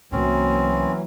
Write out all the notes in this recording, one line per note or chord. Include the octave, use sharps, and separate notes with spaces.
C2 E3 F#3 A3 A#3 C4 C#4